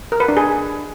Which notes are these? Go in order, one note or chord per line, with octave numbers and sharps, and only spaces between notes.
A#4
B4
D4
G#4